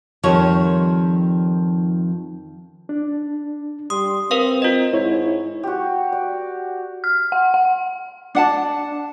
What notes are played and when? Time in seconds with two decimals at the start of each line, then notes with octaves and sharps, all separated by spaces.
0.23 F2 D#3 F3 G3 C#5
2.89 D4
3.90 G3 C6 D#6
4.31 C4 A#4 B4 F5
4.62 F4 D#5
4.93 G#2 E4 C#5
5.63 F#4 G4
6.12 D5
7.04 F6
7.32 F#5
7.54 F#5
8.35 D4 F#5 A5